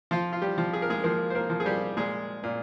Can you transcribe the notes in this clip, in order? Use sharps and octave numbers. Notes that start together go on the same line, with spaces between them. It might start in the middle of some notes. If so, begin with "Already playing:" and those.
F3 F4
F4
G3 G4
F3
G#4
A#4
G#3 G#4
F3 A#3 A#4
C5
A#3 A#4
F3
G#4
G3 G4
A#2 G#3 G#4
A#2